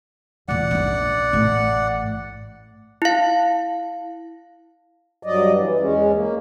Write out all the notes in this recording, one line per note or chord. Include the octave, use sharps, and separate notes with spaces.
E2 A#2 D5 F#5
A#1 C#4
A1 A2
E4 F5
G2 F#3 D5 D#5
E3
E2 G#3 C#4
A#3